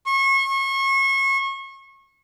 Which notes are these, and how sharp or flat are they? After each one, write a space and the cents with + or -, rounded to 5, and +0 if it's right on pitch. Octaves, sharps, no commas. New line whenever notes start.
C#6 -35